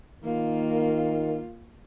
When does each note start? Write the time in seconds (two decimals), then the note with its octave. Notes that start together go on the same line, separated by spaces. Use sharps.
0.24 D#3 A#3 F4